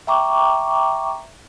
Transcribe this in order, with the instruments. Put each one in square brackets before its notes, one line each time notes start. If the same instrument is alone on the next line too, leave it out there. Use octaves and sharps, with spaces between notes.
[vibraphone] E5 G5 A#5 C#6 D6